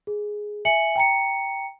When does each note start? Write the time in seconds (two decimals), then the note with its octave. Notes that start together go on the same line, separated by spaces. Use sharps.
0.07 G#4
0.65 E5 G#5 C#7 F#7
0.96 G5 A#5 C#7